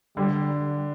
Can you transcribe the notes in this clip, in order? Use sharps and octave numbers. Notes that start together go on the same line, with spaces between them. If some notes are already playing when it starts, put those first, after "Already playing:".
D3 G3